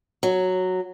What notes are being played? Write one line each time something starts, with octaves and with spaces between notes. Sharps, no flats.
F#3